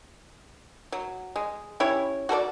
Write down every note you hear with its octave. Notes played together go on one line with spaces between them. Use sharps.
F#3
G#3
C#4 E4 G4 C#5
F#4 A4 A#4 D5